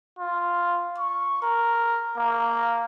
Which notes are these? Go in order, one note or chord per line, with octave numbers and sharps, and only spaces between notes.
F4
C#6
A#4
A#3